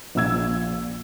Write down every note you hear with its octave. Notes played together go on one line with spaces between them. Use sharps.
A#1 A#2 E6 G#6